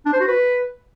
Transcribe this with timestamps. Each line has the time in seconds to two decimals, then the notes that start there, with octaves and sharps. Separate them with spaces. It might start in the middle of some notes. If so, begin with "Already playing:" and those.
0.06 D4
0.13 C5
0.20 F#4
0.28 B4